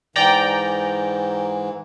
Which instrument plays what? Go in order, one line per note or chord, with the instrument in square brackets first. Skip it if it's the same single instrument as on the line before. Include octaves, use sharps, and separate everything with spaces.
[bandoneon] G#2 E3 [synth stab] D5 G5 A#5